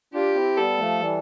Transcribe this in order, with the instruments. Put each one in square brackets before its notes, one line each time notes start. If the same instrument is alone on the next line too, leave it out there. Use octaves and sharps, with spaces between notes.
[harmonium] D4 F4 [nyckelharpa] G4
[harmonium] C4 E4
[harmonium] G3 B3 [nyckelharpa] A4
[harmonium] F3 A3
E3 G3